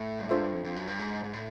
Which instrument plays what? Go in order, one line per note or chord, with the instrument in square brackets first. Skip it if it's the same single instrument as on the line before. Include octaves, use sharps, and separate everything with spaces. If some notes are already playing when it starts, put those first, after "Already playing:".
Already playing: [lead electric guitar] A2
G2
[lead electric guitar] G#2 [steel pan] D4 F4 A4 C5 E5
[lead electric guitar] G2
F2
F2
F#2
G2
G#2
G#2
A2